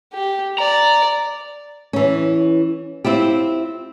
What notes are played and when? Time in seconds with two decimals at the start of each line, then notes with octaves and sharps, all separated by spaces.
0.13 G4
0.58 D5 A#5
1.93 E3 C#4
3.05 C4 E4 F4 G4